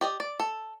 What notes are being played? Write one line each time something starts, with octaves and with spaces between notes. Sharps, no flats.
G4 D5 D#5
D5
A4